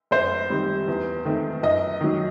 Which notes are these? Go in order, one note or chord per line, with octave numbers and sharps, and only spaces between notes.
F#2 C5
D#3 G3 C4
E2
D#3 A3 C4
F#2 D#5
D#3 F#3